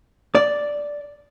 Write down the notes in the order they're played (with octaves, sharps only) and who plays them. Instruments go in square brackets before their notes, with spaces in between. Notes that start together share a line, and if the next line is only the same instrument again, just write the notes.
[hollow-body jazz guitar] D5